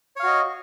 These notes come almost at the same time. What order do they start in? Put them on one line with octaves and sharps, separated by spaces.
C#5 F5 F#4 D#5